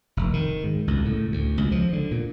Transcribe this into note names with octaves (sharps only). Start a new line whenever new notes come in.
F1
D#3
G#2
C#2
A2
D2
C#2
F3
D3
A#2